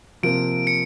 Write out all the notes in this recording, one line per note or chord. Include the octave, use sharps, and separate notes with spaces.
C3 F3 A#3 D7
C#7